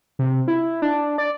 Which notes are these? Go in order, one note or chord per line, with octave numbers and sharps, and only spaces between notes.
C3
E4
D4
D5